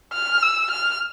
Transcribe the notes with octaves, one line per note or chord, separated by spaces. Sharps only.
F6
E6
F6